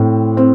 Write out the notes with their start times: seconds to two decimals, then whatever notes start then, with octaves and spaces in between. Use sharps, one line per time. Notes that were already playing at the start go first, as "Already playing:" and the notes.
Already playing: A2 C4
0.37 C4